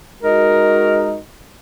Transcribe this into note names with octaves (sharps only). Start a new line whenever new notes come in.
G#3 D#4 F#4 A#4